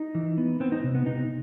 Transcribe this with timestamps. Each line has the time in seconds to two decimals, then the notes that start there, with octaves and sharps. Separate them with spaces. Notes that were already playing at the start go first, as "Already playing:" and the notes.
Already playing: D#4
0.15 E3
0.38 B3
0.60 B3 C4
0.72 D#4
0.84 C3
0.95 B3
1.06 C3 D#4